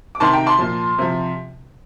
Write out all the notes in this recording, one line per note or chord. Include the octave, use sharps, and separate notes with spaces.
D6
C3 D#3 A5 C6
G5 A#5
A5 C6
A#2 F3
C3 F3